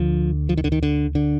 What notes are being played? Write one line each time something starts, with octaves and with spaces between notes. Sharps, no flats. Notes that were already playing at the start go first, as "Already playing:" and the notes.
Already playing: D2 D3 F3
F3
D#3
D3
D#3
D3
D3